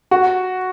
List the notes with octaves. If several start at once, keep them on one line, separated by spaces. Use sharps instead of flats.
F#4